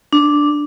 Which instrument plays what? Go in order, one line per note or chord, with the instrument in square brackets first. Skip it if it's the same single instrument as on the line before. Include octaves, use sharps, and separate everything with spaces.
[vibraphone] D4